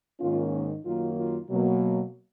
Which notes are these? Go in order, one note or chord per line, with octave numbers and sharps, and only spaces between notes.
G#2 D#3 A#3 C#4 F4
D#4
F#2 D#3 F#3 A#3 F4
F4
B2 F#3 A#3